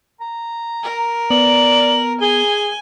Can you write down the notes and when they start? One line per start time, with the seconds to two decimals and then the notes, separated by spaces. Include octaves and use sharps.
0.21 A#5
0.83 A#4
1.30 B3 D5 F#7
2.21 G#4 G#5 G7